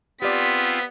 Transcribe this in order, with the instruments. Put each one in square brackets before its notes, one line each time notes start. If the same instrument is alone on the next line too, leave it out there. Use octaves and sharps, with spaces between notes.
[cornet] B3 [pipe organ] C4 F4 [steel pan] G4 D5 [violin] B6